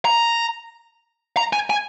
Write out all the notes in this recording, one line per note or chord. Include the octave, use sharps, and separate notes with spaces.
A#5
A#5
G#5
G#5